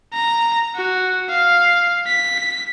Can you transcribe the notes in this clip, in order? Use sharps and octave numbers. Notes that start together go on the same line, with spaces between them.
A#5
F#4
F5
B6